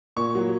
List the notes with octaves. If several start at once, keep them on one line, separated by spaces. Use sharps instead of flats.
A#2 C#6
F#3